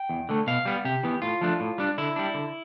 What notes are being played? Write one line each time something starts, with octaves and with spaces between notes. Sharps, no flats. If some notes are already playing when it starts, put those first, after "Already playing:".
Already playing: G5
E2
D3 A3
B2 F5
G3 B3
C3 G4
E3 B3
A2 F4
F3 A3 D4
A2
G3 D4
D3 E4
G3 D4
D3